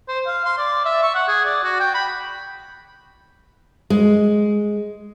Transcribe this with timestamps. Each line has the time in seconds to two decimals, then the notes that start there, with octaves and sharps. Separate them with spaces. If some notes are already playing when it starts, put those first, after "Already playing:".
0.08 C5
0.26 F5
0.45 C6
0.58 D5
0.85 E5
1.03 C#6
1.15 F#5
1.28 G#4
1.45 D5
1.63 F#4
1.80 G5
1.94 B5
3.90 G#3